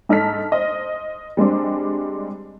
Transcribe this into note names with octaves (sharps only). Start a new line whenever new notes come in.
G#2 D#4 A4 A5 F6 B6
C5 D#5
G3 G#3 C4 D4